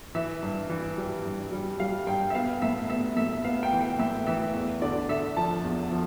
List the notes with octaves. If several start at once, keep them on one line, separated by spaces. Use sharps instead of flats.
E3 E5
G2
E3
G3
G2
G3
G3 F5
G2 G5
E5
B3 F5
A2 E5
B3 E5
A2 E5
B3 F5
G5
E3
G5
A2 E5
E3 E5
E2
D3 D5
D3 E5
F3 A5
E2
F3